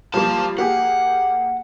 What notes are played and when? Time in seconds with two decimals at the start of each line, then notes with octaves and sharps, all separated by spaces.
0.14 F3 G3 A#3 F4 A5
0.58 A#3 G4 G#4 F#5